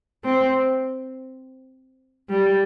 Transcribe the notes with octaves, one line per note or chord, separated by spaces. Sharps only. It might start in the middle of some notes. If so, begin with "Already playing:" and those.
C4
G3